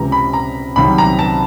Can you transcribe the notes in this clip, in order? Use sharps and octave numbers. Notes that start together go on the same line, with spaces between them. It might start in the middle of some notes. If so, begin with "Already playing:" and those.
Already playing: C#2 C3 E3 A#5
B5
A#5
C2 C3 D#3 F#3 B5
A#5
A5